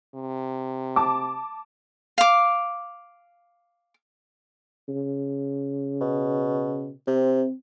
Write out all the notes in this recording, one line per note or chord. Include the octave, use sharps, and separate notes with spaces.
C3
A5 D6
F5 D6
C#3
B2
C3 C4